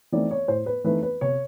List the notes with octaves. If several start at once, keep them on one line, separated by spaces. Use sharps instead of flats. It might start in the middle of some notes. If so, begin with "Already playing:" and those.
E3 A3 C4 D#4 D5
C#5
A2 C5
B4
E3 A3 C4 D#4 B4
B4
C3 C#5